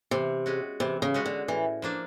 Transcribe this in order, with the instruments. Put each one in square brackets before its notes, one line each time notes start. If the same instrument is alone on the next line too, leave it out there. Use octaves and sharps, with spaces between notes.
[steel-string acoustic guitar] C3 [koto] E3
[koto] G#3 C#4 F#4
[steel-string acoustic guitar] C3 [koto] E3
[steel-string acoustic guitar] C#3
[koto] G#3 C#4 F#4
[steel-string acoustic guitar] D3
[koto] A2 [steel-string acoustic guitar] E3
[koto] F3 A#3 D4